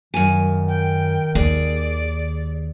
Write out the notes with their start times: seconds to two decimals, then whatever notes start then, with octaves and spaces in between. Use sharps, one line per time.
0.14 F#2 D#3 G#5
0.68 G5
1.35 D#2 G#4 D5